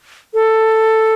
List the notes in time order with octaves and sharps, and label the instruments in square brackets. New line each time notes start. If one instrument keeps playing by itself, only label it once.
[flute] A4